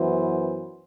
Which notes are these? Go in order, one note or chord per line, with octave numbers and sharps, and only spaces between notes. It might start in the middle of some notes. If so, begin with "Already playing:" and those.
Already playing: F#2 E3 B3 F#4 C5